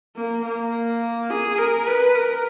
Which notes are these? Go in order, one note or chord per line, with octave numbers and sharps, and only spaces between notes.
A#3
A#3
G#4
A#4
B4
A#4